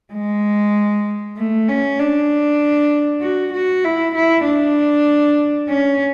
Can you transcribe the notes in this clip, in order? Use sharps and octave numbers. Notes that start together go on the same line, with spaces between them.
G#3
A3
C#4
D4
F#4
F#4
E4
E4
D4
C#4